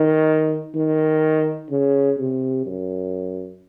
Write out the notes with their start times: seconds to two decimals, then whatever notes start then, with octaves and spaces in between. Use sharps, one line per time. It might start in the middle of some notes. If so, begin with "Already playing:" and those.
Already playing: D#3
0.75 D#3
1.70 C#3
2.19 C3
2.66 F#2